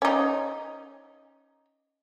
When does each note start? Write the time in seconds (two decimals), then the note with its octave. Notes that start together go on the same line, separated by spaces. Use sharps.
0.02 C#4 D#4